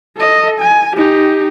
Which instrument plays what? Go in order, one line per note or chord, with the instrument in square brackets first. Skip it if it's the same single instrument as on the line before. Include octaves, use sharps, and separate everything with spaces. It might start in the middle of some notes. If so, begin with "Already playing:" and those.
[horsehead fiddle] A4 D#5
G#5
D#4 G4